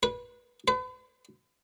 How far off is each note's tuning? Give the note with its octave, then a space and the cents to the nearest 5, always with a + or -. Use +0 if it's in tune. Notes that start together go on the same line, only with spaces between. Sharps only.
B4 -20
B4 +40